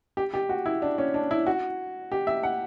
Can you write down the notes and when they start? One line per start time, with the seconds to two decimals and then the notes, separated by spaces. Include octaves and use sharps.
0.17 G4
0.34 G4
0.49 F#4
0.66 E4
0.82 D4
0.98 C#4
1.14 D4
1.31 E4
1.47 F#4
2.12 G4
2.27 E5
2.43 F#5